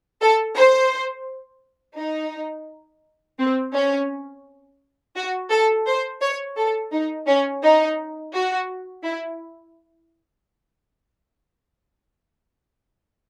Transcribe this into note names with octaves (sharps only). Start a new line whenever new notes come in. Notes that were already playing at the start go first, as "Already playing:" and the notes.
A4
C5
D#4
C4
C#4
F#4
A4
C5
C#5
A4
D#4
C#4
D#4
F#4
E4